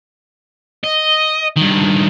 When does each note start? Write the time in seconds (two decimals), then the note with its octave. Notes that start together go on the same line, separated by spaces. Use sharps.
0.84 D#5
1.57 G2 D#3